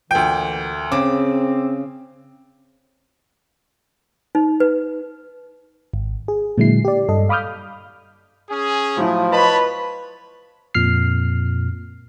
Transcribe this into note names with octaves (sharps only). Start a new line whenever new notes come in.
D2 A#2 E3 G5
C#3 C4 D6
D#4
B4
G#1
G#4
A#2 D3 F#3 G#3 E4 C7
G4 D5
G2 A4 D#5
F5 B5 D6 D#6 F6 G6
C#4 G#4
A2 F3 F#3 E4
B4 C#5 D#5 A5 B5
F2 A#2 F6 C7